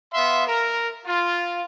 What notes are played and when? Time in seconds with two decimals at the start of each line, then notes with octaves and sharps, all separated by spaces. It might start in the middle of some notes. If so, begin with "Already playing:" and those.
0.14 B3 E5 F5 C6
0.47 A#4
1.05 F4